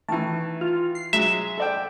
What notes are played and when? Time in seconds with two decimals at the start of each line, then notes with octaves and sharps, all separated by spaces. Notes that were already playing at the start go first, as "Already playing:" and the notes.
0.09 D#3 E3 A3
0.61 F4
0.95 C7
1.13 F#3 G#3 E5
1.58 A4 D5 G5